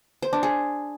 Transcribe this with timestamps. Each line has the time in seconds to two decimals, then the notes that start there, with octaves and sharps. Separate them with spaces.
0.22 C5
0.33 D4
0.43 G#4